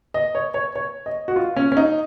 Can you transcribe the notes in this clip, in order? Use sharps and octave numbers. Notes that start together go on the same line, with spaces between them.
D#5
C#5
C#5
C#5
D#5
F#4
F4
C#4
C#4
D#4